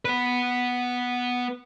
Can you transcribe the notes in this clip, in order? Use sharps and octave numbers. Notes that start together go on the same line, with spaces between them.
B3 B4